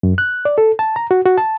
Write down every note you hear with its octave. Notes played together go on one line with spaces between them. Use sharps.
F#2
F#6
D5
A4
A5
A#5
F#4
F#4
A5